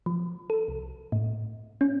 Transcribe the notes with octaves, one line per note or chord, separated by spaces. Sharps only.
F3
A4
C2
A2
C#4